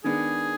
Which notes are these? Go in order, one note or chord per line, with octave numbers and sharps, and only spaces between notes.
D#3 G#3 B3 D4 G#4